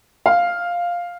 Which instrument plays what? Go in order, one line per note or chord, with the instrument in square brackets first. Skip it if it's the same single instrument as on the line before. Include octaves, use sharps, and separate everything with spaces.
[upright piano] F5